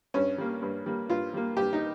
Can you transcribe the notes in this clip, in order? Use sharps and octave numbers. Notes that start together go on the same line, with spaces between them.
G2 C#4
G3 A#3
G2
G3 A#3
G2 F4
G3 A#3
G2 G4
D#4